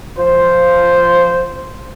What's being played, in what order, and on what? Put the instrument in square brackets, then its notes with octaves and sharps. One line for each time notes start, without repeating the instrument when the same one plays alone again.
[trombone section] F3 F4 C5